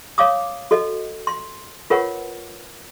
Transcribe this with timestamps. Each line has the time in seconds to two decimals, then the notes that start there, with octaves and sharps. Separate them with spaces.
0.18 C#5 F5 D6 D#6
0.71 F#4 A4 D#5
1.27 C6
1.90 F4 A#4 B4 C#5 F#5